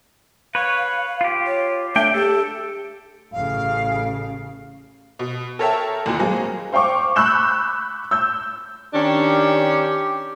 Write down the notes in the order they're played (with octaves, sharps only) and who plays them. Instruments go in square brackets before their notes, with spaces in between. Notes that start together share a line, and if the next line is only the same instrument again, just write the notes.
[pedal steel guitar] B4 C#5 [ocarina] F5
[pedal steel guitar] F4 G4
[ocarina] C#5
[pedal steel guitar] A3 D4 G5 [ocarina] E5
[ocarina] G4 [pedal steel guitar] A4
[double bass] A1 C#3 [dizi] F5
[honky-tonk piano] B2
A4 A#4 C#5 E5 G5 A5
A1 D#2 A#2 F#4
F#3 G#3 A#3 C4 G#4
C5 F5 G5 C#6 D6
B5 C#6 E6 F#6 G6 E7
E6 G6
[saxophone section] D#3 C#4 D4 [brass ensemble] G4